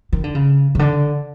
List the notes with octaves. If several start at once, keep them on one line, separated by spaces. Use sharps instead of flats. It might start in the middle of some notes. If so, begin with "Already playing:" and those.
D#3
D3
C#3
C#3
D3